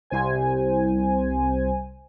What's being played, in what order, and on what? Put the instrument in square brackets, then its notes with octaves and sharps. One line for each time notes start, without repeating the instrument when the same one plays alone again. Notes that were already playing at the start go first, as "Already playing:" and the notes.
[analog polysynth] C2 C5 G#5